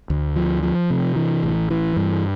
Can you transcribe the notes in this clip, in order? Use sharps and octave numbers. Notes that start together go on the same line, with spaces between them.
D2
F3
F3
C3
E3
A1
E3
G2